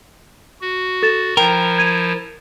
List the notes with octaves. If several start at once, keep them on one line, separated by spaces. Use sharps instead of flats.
F#4
A4 A6 E7
F3 E4 A#4 G5
G#6 D#7